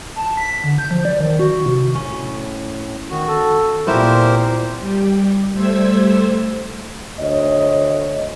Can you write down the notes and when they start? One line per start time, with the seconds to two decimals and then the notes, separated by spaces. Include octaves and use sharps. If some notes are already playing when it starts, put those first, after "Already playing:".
0.16 A5
0.37 B6
0.64 D3
0.78 G6
0.91 F3
1.05 D5
1.21 D#3
1.39 F#4
1.66 C3
1.95 A2 C#4
3.10 D#3 F#4
3.28 A4
3.87 A#2 B3 C4 E4 G4 A#4 C5
4.79 G3 G4
5.53 G3 A3 C5 E6 G#6
7.20 D2 C#5 D#5